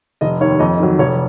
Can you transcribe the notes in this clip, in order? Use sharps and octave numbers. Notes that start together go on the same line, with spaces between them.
F1 D#5
D#2 D#3 C#5
F2 D#5
D#5
D#3 F#3
F1 C#5